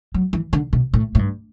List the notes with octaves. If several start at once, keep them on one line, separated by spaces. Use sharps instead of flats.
F#3
E3
D3
B2
A2
A2
G2